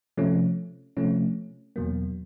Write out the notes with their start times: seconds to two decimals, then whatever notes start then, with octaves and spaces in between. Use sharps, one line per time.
0.17 C3 F3 A3 C#4
0.97 C3 F3 A3 C#4
1.76 E2 B2 F#3 A#3